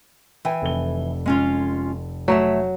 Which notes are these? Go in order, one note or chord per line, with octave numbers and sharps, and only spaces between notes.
E3 G5 G#5
F1 A4 G7
G#3 C#4 F4
F#3 A3 C#5 E5